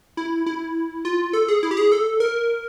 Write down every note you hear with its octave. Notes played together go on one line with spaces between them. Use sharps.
E4
E4
F4
A4
G#4
E4
G4
G#4
A4
A#4